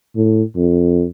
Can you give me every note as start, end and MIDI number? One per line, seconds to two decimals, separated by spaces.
0.16 0.43 45
0.56 1.05 41